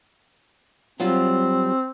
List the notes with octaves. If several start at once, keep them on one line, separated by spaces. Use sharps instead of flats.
F#3 G3 C4 F4